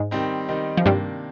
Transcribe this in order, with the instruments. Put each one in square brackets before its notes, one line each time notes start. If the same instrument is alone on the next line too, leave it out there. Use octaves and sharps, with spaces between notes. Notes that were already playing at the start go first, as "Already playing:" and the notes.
Already playing: [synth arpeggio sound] G#2 G#3
[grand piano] D#3 G3 C4 D#4
D#3 G3 C4 D#4
[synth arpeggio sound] F3
[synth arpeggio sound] G2 G3 [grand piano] C3 D#3 A#3 D4